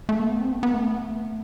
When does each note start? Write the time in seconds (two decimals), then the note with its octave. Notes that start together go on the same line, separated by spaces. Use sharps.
0.09 A3
0.20 A#3
0.30 B3
0.41 C4
0.52 B3
0.63 B3
0.74 A3